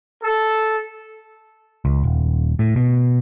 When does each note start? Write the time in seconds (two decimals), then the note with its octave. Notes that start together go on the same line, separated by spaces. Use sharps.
0.23 A4
1.85 C#2
2.03 D#1
2.59 A2
2.76 B2